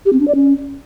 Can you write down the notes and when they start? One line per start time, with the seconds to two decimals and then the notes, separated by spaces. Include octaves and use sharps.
0.05 G4
0.13 C4
0.20 D4
0.28 D5
0.35 C#4